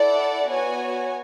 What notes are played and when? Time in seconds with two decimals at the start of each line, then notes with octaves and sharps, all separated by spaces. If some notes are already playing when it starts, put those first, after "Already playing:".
Already playing: E4 A4 D5 F#5
0.48 B3 F#4 C#5 G#5